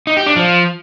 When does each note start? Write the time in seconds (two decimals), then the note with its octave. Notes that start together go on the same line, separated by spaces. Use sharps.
0.07 D#4
0.17 G4
0.27 D4
0.36 F3